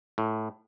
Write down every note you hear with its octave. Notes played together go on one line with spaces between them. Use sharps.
A2